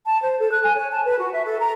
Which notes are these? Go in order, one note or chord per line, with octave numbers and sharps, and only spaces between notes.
A5
C5
A4
F#6
G#5
C#5
A5
B4
F#4
E5
A4
A#5